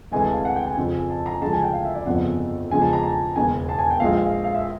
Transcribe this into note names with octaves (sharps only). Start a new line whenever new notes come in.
D2 C3 E3 G#3 G#5
A5
F5
F#5
G5
G#5
F2 C#3 F3
A5
A#5
D2 C#3 F3 G#3 A5
G#5
G5
F5
E5
D5
G1 F2 C#3 F3 F#5
E2 C#3 F3 G#3 G#5
A5
A#5
A5
E1 D#2 C#3 G#5
A5
G#5
G5
A#1 A#2 F3 G#3 F5
F5
F5
E5